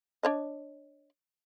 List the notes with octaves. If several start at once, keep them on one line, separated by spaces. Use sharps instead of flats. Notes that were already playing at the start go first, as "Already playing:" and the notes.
D4 C#5 D#5